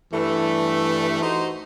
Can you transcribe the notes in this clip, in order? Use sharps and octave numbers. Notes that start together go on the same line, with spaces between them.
G2 E3 A3
D#4 F#4 C5